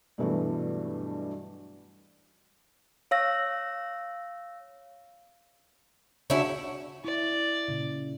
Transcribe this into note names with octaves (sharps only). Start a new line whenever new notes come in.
G2 B2 E3 F#3 A3
C#5 F5 E6 A#6
C#3 C#4 D4 E4 F#4
E4 D5
A#2 C#3